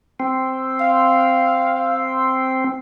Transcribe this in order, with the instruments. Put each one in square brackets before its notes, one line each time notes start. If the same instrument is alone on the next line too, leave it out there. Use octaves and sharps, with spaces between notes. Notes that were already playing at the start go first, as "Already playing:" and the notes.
[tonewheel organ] C4
[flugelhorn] F5